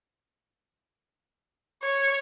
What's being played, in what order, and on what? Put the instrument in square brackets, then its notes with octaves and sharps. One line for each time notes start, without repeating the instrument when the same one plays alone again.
[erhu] C#5